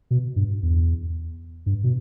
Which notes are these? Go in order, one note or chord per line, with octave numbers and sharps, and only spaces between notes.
B2
G2
E2
G2
B2